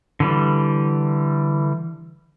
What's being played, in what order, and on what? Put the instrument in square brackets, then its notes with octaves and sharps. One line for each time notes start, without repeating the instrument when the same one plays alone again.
[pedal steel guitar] D3 E3 G3